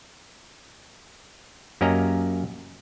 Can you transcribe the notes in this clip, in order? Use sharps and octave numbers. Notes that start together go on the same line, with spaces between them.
F#2 A#3 C#4 G4 D#5 A#5